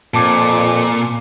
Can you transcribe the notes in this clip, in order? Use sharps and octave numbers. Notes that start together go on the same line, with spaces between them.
F2 A#2 A5 D6 C#7